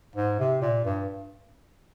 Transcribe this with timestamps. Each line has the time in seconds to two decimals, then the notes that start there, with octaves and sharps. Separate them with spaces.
0.16 G#2
0.39 C3
0.62 A#2
0.85 G2